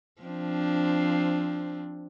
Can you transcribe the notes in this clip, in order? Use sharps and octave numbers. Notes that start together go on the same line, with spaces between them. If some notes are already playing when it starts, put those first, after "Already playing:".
F3 C4 D4